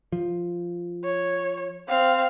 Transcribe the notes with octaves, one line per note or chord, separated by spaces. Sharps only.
F3
C#5
C4 F5